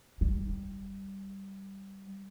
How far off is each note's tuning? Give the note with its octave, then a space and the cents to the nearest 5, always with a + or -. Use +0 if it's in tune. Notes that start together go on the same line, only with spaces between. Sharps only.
G3 -10